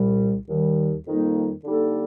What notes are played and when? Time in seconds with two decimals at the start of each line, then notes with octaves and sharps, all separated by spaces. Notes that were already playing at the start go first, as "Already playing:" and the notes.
Already playing: C2 A#2 G3
0.48 D#2 D#3 G3
1.07 F2 D#3 G3 A#3 D#4
1.64 D3 G3 A#3 D#4 A4